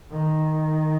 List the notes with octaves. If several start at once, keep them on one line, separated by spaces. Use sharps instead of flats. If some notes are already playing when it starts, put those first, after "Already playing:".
D#3